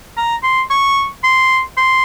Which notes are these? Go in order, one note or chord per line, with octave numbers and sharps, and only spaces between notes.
A#5
C6
C#6
C6
C6